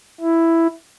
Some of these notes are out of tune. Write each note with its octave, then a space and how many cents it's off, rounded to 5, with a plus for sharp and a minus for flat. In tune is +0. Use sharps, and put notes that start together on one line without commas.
E4 +5